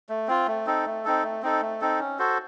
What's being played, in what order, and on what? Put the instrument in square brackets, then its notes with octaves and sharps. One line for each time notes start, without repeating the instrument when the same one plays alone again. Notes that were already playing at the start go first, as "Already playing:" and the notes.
[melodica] A3
C4 F4
A3
C4 D#4 A4
A3
C4 D#4 A4
A3
C4 D#4 A4
A3
C4 D#4 A4
C#4
F#4 A4 C5